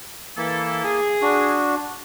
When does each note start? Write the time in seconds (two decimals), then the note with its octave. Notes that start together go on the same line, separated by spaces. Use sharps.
0.37 E3 A#3 E4 A4
0.84 G#4
1.22 D4 F#4